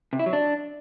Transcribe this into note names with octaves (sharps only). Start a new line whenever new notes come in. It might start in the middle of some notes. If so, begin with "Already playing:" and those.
C3
E4
F#3
D4